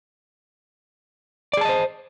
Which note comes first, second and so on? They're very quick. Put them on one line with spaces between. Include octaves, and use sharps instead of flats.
D5 G#4 A5 D#5 C5